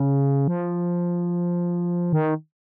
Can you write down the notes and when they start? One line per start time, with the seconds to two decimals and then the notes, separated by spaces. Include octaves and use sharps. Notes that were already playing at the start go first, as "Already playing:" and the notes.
Already playing: C#3
0.48 F3
2.13 D#3